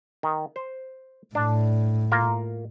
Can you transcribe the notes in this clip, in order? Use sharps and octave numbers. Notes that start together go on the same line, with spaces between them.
D#3
C5
A2 D4 A5
A#3 F4 A#4